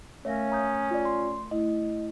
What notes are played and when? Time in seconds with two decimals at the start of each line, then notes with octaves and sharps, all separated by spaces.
0.25 A3 C#4 A#4 C#5 E5 F5 A#6
0.52 A#5 D#6 G6
0.91 F4 D5
1.05 C6
1.51 A3 E4 D#5